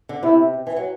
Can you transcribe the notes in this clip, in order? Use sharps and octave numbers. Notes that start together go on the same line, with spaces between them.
D3
C3 E4
E3
F#3